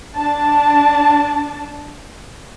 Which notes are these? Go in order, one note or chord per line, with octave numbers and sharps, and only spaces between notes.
D4 A5